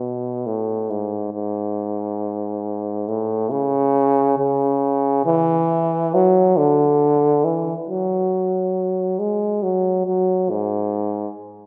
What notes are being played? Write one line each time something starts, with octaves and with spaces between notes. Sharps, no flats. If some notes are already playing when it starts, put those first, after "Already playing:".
Already playing: B2
A2
G#2
G#2
A2
C#3
C#3
E3
F#3
D3
E3
F#3
G#3
F#3
F#3
G#2